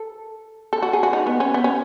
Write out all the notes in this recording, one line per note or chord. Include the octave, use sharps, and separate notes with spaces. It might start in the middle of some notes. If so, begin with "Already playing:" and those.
Already playing: A4
A4
F#4
G#4
F#4
D#4
B3
C#4
B3
C#4